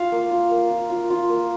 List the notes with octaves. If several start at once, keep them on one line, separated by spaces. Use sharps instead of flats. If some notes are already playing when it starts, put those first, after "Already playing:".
Already playing: F4 F5
A#3
F4
A#3
F4
F4
F4
A#3